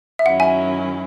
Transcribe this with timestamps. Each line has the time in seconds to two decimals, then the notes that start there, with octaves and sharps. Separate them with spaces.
0.19 E5
0.25 F#2 D#3 F#3 C#4 E4 F#5
0.40 E5 G#5